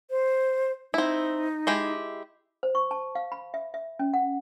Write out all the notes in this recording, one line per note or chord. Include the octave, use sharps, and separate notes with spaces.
C5
C4 D#4 E4
G#3 E4 G4
C5
C#6
A5
F5
B5
E5
E5
C#4
F#5